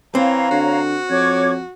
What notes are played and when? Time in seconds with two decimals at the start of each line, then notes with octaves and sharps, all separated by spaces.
0.15 E3 C4 C#5 F5 A#5
0.51 D3 F#4
1.10 F2 C#5 D6 G#6